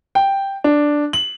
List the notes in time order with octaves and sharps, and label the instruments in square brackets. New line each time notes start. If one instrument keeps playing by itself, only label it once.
[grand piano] G5
D4
F#7